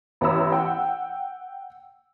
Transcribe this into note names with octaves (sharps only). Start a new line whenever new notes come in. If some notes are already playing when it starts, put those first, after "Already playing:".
A1 B3 C#5 A#5 B5 E6
F#5 G5